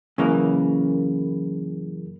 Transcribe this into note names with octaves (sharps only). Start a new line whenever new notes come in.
F#2 C#3 E3 A#3